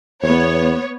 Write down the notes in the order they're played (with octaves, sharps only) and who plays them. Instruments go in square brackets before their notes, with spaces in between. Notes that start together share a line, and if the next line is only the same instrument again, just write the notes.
[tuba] E2 [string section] B3 C#5